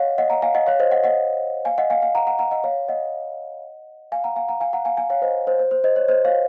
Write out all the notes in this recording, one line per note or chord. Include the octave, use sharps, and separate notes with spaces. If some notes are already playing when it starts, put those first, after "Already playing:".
Already playing: C#5 D#5 F5 F#5
D#5 F#5
F#5 A#5
F5 G#5
D#5 F#5
C#5 F5
C5 D#5
D#5 F#5
D#5 F#5
F5 G#5
D#5 F#5
F5 G#5
F5 G#5
F#5 A#5
F#5 A#5
F#5 A#5
D#5 F#5
C#5 F5
D#5 F#5
F5 G#5
F#5 A#5
F5 G#5
F#5 A#5
F5 G#5
F#5 A#5
F5 G#5
F5 G#5
C#5 F5
C5 D#5
C5
C5
C5
C5 D#5
C#5
C5 D#5
C#5 F5